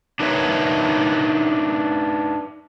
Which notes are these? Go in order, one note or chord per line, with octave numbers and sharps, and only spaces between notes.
D4 D#4 A#4 B4 C#5 E5